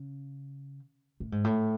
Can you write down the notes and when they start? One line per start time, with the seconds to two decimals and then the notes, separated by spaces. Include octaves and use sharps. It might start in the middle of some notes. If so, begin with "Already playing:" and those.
Already playing: C#3
1.20 A2
1.32 G#2
1.44 A2